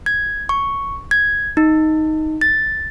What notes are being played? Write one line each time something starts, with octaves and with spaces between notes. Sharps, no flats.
G#6
C#6
G#6
D#4
A6